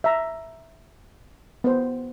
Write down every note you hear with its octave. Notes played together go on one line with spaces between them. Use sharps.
E5 A#5
B3 C5